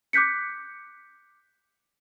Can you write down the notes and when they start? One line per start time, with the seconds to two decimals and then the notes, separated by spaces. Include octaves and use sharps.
0.13 D6 F#6 G6 B6 C#7